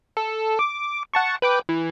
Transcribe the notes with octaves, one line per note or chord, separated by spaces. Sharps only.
A4
D6
F#5 A5 C#6
B4 G5 D6
E3